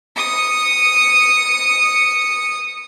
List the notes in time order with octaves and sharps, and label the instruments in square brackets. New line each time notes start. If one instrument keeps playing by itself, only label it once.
[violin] D#6 C#7